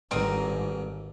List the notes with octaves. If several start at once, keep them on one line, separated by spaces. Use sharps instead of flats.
G#1 G2 D3 C4 D#4 A#4